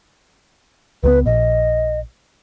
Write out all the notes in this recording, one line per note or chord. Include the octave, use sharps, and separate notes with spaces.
C#2 F#3 B3 B4
A#1 D#5